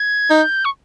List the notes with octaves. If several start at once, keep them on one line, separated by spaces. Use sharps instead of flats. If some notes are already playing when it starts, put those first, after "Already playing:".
Already playing: G#6
D#4 G6
C#6